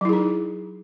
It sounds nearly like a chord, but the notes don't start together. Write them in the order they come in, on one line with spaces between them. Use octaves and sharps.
F#3 E4 G#4 D#4